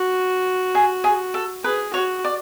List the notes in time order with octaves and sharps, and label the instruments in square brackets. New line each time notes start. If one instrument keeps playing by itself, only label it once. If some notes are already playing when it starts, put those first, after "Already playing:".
Already playing: [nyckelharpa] F#4
[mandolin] G#4
G#4
A4
[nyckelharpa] G#4 [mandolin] B4
[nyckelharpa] F#4 [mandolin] C#5
[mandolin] D5